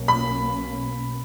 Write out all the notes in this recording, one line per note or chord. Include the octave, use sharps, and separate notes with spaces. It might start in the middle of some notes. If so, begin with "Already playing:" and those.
Already playing: B1 B2 A#3 C#4
B5